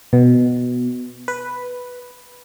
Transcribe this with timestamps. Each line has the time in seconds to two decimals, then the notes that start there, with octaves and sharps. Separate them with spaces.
0.13 B2
1.28 B4